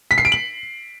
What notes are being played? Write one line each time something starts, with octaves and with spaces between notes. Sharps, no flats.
B6
C7
D7
F#7